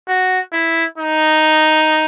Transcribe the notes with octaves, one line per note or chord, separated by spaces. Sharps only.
F#4
E4
D#4